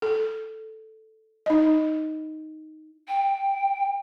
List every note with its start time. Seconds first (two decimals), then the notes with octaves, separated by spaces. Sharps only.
0.02 A4
1.46 D#4 D#5
3.08 G5